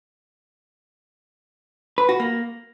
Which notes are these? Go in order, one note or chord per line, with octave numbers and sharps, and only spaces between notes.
B4
F#4
A#3